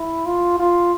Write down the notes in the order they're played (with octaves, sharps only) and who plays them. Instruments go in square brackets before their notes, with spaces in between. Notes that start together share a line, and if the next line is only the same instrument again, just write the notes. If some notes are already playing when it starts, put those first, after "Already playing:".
Already playing: [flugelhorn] E4
F4
F4